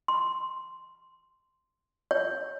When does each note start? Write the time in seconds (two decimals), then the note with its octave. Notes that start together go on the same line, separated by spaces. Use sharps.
0.08 C6
2.11 C#5